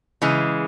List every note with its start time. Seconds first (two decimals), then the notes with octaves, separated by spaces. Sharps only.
0.22 C#3 E3 G#3